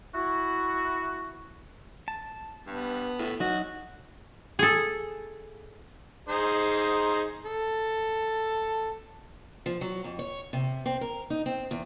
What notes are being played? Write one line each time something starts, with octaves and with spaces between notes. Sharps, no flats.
E4 F#4
A5
G2 B3
A2
F#3 D#4 F#4
G#4 A4
D#4 G#4 C5
A4
F3
F#3
F2
C#5
C3
C4
A#4
D#4
C4
E2